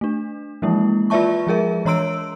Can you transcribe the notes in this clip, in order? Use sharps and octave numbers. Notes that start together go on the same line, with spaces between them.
A3 D4
E3 F3 G#3 A#3 E4
F4 B4 D5 E5 A5 C#6
F3 G#3 G#4 A#4 E5
E3 C#5 A#5 C6 E6 D7